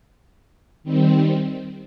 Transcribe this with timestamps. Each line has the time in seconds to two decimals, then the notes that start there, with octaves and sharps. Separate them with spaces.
0.83 D#3 G3 C4